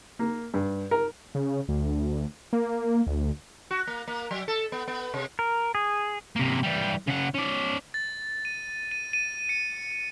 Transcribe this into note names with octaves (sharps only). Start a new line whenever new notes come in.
A#3
G2
A#4
C#3
D2
A#3
D2
F#4
A#3
A#3
F#3
A4
B3
B3
C3
A#4
G#4
C3 A#3
E3 G3
C#3 F#5
C#4 D5
A6
D#7
D#7
D#7
C#7